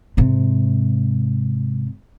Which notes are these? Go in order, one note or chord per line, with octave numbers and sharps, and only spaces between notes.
G#2 C3